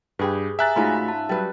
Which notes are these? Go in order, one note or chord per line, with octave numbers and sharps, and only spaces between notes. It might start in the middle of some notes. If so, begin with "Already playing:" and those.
G2 G4 G#4 B4
E5 G#5 A#5 F#6 A6
G#2 A3 C#4 D#4 F4 F#4 B5
A5
F#3 G3 B4